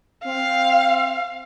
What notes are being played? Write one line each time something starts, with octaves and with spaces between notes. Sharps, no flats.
C4 F5